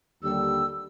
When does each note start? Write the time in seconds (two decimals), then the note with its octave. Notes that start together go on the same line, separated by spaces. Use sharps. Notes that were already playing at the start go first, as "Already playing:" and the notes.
0.23 D#2 D3 G3 E6